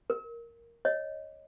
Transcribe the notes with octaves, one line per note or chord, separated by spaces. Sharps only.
A#4
C#5 D#5